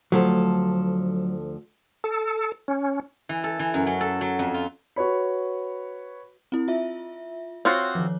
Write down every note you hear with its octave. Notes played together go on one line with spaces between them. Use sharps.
D2 F3 F#3 A4
A4
C#4
E3
A4
E3
F#2
F#3
A4
F#3
F2
F4
F#4 B4 C#5 B5
C4 E4
F4 E5
C4 F4 F#4 C#5 D6 F#6
D#3 F3